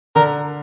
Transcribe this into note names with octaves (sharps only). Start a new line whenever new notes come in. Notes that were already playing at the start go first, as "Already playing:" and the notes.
D3 A#4